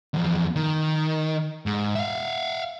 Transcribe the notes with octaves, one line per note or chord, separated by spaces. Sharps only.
E2 F3
D#3
G#2
E5 F5